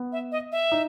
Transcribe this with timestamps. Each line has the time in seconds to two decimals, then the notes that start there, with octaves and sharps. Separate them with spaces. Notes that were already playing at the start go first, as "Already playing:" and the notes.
Already playing: B3
0.12 E5
0.32 D#5
0.52 E5
0.72 D#4